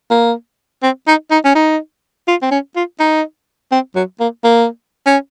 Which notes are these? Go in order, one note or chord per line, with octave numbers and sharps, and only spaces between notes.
A#3
C4
D#4
D#4
C#4
D#4
F4
C4
C#4
F4
D#4
C4
F#3
A#3
A#3
C#4